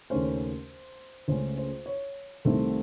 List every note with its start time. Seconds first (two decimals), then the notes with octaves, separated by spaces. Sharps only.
0.10 D#2 C#3 A3 C#4 C5
1.28 C#2 C#3 A3 C#4 C5
1.58 C5
1.86 C#5
2.45 C2 C3 D#3 A3 C4